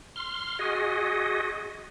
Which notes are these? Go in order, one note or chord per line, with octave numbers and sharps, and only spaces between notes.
C6 F6
F#4 G#4 D#5